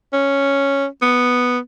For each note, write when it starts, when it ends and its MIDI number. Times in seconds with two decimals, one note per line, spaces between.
0.13 0.86 61
1.01 1.59 59